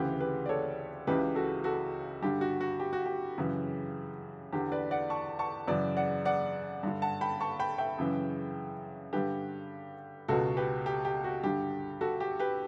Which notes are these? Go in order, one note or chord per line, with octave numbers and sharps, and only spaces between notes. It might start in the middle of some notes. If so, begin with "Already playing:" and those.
Already playing: D2 C#3 E3 G4 B4
G4 B4
D5
A4 C#5
C#2 C#3 E3 G4 B4
F#4 A4
F#4 A4
G2 D3 G4
F#4
F#4
G4
F#4
G4
F#2 C#3 E3
E2 D3 G4
B4 D5
D5 F#5
A5 C#6
A5 C#6
F#2 C#3 E3 B4 D5
D5 F#5
D5 F#5
G2 D3
F#5 A5
G5 B5
A5 C#6
G5 B5
E5 G5
F#2 C#3 E3
G2 D3 G4 B4
C#2 B2 F#4 A4
G4 B4
G4
G4
F#4
G2 D3 G4
F#4 A4
G4
G4 B4